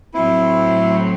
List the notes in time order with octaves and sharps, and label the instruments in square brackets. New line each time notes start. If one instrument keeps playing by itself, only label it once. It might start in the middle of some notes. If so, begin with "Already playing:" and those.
[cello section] A2 F#3 C4 [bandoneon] E4